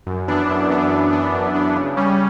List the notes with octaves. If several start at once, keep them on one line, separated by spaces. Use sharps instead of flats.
F#2
E3 B3 D4
F#2
E3 B3 D4
F#2
E3 B3 D4
F#2
E3 B3 D4
C#3
G3 C#4